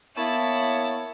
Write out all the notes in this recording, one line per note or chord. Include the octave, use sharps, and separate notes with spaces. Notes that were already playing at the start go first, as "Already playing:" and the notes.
A#3 B3 E4 C#5 A5